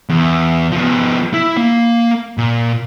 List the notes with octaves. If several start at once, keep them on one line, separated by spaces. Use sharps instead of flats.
E2
F3 B3
E4
A#3 F5
A#2